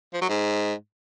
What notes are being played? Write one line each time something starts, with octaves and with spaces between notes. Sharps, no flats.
F3
F#3
G#2